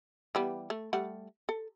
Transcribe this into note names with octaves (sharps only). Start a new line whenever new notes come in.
E3 G3 B3
A3
G3 A3 F#5
A4